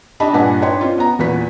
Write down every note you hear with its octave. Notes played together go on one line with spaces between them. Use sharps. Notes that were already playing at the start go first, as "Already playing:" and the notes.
D4 G4 D#5 A5 B5
G2 A#2 B4 F#5 G#5 A5
D4 D#4 B4 C#5 G5 C6
C4 C#4 F4
B3 A#5
E2 A#2 F#4 B4 B6